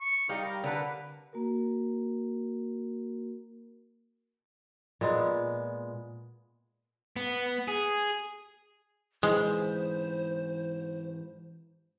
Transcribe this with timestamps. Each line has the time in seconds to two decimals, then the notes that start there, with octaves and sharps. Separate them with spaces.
0.01 C#6
0.29 G3 D#4 F5 G5
0.43 A#4
0.64 D3 A#4 B4 A5
1.33 A#3 F#4 A#4
5.01 A#2 G#3 B3
7.16 B3
7.68 G#4
9.23 G#2 E3 G#3 C5